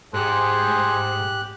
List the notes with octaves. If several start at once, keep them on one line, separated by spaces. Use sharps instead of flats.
G#2 G4 G#4 C5 F#6